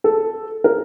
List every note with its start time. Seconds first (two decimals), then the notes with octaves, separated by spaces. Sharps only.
0.04 A4
0.64 A#4